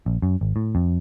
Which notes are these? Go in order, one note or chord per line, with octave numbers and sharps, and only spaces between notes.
A#1
F#2
G#1
A2
F2